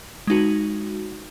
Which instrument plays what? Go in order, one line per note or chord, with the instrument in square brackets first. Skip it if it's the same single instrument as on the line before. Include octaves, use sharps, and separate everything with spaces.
[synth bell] G#3 D#4 F#4